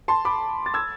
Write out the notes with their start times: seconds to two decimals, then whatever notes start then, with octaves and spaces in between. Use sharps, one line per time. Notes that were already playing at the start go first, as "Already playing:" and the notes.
0.08 A5 C6
0.25 B5 D6
0.66 A6
0.74 E6 G#6